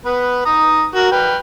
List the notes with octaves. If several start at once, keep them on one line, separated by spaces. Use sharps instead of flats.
B3 B4
A#5 D#6
F#4 A#4
B4 G5 F6